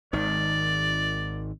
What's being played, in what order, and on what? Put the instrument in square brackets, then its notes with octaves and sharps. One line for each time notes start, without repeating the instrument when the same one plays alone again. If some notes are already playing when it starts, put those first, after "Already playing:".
[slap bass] G#1 D#3 [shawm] D5